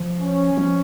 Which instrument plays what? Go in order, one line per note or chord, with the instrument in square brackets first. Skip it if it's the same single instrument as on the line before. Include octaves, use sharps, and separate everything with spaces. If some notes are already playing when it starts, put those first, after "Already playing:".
Already playing: [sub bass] F3
[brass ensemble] C#4
[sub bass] F3